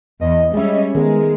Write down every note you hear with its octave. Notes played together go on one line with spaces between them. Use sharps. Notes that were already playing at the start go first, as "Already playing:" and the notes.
E2 D#5
G3 G#3 C#4 E5
D#3 G#3 B3 G#4 A#4